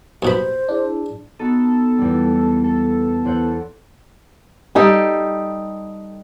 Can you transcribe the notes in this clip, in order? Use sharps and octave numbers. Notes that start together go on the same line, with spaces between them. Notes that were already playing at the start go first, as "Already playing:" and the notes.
D#2 B2 C5 B5
D4 E4 G#4
B3 D#4 F#4 A4
E2 G3
A4
E2 C5 F#5
G3 D#4 G4 A4